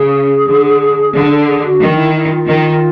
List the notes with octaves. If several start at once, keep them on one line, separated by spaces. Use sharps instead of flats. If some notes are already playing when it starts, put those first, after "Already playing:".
Already playing: C#3 G#4
D3
D3 G#4
A4
G#4
F#4
D#3
D#4
E4
E4
F4
D#3